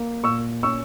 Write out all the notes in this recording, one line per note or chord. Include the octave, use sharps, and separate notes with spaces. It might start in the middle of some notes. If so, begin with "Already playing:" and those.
Already playing: A#3
A#2 C#6 E6
C#4 C#6 E6